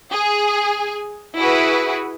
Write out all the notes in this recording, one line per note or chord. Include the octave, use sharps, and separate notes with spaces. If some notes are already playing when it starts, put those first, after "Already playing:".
G#4 G#5
E4 F#4 G#4 B4